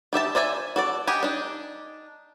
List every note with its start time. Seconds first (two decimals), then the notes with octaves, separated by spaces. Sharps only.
0.13 D#3 G4 E5 A5
0.35 C5 D5 E5 G#5
0.76 F#4 A4 D5
1.07 G4 D#5 F#5 G#5
1.23 D4 D#4